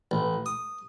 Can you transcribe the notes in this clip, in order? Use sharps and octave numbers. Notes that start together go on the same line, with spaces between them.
A1
D#6